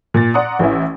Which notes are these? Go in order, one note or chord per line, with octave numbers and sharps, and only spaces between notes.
A#2 A6
D5 F#5 A#5 C6 D#6
A1 E3 C#4 E4